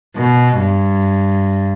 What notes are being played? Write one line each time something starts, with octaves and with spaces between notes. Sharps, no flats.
B2
G2